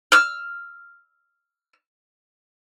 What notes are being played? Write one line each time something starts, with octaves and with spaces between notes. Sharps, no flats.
E6 F6